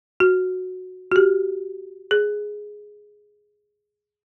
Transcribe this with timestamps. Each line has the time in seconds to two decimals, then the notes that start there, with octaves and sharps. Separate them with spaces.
0.20 F#4
1.12 F#4
1.16 G4
2.11 G#4